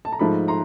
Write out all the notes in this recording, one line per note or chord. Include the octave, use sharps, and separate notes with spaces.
A5
A#5
G#2 F3 A3 A5 B5
A#5 C6